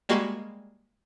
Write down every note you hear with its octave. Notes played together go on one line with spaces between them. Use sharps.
G3 G#3 A#3 F#4